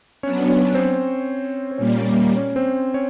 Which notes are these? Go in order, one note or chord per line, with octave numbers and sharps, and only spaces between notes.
F#3 B3 C#4 D4 C#5
C#4 C#5
C4 C5
C5
A#2 G3 A#3 C#4 C#5
D5
C#4 C#5
C#4 C#5
C4 C5
C#4 C#5